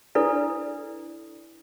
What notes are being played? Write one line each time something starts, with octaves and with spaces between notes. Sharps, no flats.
D4 E4 A4 B4 D5